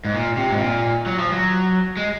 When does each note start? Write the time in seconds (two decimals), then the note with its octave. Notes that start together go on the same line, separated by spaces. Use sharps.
0.05 G#2
0.14 A#2
0.37 C3
0.51 G#2
0.59 A#2
1.06 F#3
1.19 F3
1.32 F#3
1.97 G#3